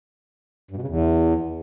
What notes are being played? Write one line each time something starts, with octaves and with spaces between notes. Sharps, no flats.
G2
B2
C#3
E2